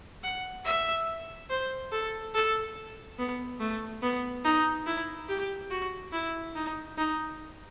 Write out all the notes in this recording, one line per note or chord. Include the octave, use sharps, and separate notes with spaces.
F#5
E5
C5
A4
A4
B3
A3
B3
D#4
E4
G4
F#4
E4
D#4
D#4